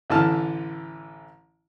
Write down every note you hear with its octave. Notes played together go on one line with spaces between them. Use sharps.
A1 D3 E3 A5 F6